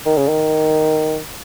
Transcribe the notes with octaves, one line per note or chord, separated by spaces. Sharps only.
D#3
C#3
D#3